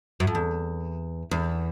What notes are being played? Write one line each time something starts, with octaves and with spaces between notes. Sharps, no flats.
F#2
F2
E2
E2